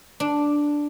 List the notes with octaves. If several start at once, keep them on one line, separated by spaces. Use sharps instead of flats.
D4